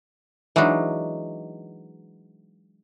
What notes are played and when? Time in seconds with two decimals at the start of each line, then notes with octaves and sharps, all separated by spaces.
0.56 E3 F#3 G#3 D4 D#4